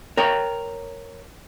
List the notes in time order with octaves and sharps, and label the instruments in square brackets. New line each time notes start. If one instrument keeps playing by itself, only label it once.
[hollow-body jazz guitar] A#4 C#5 G5